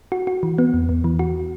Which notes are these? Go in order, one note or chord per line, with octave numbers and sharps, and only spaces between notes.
F#4
F#4
E3
B3
E2
E2
E3
F#4